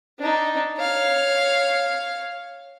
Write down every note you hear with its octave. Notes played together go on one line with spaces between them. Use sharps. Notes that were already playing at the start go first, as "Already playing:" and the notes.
D4 D#4
C#5 F5